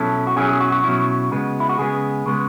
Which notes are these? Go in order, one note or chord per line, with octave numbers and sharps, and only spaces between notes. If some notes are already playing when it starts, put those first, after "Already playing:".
Already playing: B2 F#3 C#4 E4 A4
F#4
B2 F#3 C#4 E4 G#4
G#4
F#4
F#4
B2 F#3 C#4 E4
C#3 G#3 B3
E4
F#4
C#3 G#3 B3 G#4
C#3 G#3 B3